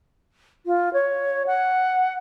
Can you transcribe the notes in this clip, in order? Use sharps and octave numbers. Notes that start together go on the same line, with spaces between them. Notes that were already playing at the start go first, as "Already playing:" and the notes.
F4
C#5
F#5